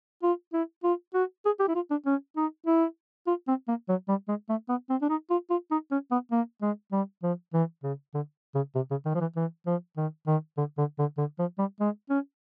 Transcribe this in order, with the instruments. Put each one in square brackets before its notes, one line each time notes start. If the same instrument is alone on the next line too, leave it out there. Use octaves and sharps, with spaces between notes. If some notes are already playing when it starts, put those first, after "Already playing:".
[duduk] F4
E4
F4
F#4
G#4
G4
E4
F4
D4
C#4
D#4
E4
F4
C4
A#3
F#3
G3
G#3
A3
B3
C4
D4
D#4
F4
F4
D#4
C#4
B3
A#3
G#3
G3
F3
E3
C#3
D3
C#3
C3
C#3
D#3
F3
E3
E3
F3
D#3
D#3
D3
D3
D3
D3
F3
G3
G#3
C#4